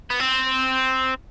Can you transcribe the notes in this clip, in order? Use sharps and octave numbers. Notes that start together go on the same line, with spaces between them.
B3
C4